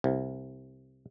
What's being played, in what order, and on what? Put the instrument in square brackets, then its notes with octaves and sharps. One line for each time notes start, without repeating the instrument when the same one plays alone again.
[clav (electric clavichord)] C2